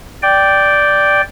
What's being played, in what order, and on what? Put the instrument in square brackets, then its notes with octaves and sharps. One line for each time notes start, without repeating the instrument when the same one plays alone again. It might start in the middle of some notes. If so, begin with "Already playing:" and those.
[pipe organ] D5 G5